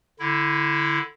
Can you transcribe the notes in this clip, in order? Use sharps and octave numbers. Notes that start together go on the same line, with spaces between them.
D3 E4